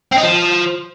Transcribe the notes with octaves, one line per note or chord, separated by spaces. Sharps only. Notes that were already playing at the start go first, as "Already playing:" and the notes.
C4
D#4
F3